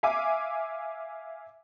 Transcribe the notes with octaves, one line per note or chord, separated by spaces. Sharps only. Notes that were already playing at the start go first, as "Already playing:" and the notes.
E5 F5 G#5 D6